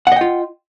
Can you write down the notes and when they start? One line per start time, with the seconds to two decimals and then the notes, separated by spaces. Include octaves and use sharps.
0.07 F#5
0.12 D#5
0.16 G5
0.21 F4